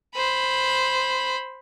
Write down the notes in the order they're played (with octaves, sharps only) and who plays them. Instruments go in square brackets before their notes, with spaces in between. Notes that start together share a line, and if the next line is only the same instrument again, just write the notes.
[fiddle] C5 B5